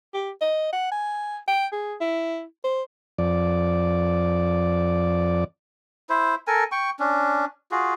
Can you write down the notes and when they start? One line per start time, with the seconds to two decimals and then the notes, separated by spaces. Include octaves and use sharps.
0.14 G4
0.41 D#5
0.73 F#5
0.92 G#5
1.48 G5
1.72 G#4
2.01 E4
2.64 C5
3.18 F2 D5
6.10 E4 C5
6.47 A4 A#4 G#5
6.72 G5 C#6
6.99 C#4 D4
7.71 F4 F#4 G#4